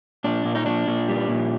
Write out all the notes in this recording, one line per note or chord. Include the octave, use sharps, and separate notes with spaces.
A#2 D4
A#2
D#4
A#2 D4
A#2
G3
A#2